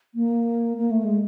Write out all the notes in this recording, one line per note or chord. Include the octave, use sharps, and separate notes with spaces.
A#3
A#3
A3
G#3